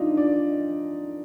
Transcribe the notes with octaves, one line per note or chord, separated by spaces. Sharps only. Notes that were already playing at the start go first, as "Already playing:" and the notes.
Already playing: D4 D#4 F4
D5